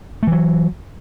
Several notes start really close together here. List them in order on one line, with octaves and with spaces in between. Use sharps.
A3 E3 F#3